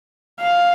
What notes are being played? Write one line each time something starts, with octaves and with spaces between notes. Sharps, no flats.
F5